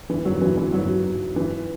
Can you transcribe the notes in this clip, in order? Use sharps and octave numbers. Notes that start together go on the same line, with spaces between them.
E3
F#3
E3
E3
F#3
E3